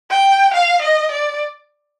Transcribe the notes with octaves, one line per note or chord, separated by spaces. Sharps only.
G5
F5
D#5
D5